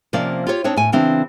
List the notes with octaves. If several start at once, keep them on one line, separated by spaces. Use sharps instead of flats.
C3 F3 A#3 C#4 D5 F5
F4 G4 C#5
C4 D4 D#4 C#5
A2 G#5
C#3 E3 C4 D4